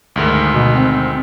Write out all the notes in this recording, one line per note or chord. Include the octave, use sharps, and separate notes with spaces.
D2 G#2 D#3
B2
C4